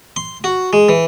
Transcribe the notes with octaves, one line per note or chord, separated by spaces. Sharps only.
C6
F#4
G#3
E3